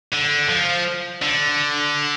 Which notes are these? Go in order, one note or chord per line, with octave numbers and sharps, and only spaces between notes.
D3
F3
D3